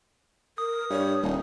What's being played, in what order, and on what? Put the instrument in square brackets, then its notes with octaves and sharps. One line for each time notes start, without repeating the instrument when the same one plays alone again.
[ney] A#4 [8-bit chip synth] D#6
[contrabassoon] G2 [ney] C#5
[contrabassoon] D#1 [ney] D#4